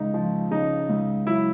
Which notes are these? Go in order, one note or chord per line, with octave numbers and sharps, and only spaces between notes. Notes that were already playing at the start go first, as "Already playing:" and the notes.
Already playing: C#2 D#4
F3
C#3 D#4
C#2
F#3 E4